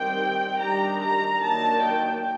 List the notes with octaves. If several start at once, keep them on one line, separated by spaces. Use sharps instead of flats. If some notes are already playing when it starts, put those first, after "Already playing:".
Already playing: D#3 G3 C4 G5
D#3 G3 D4 A#5
A#5
D#3 F#3 A#3 D4 A5
G5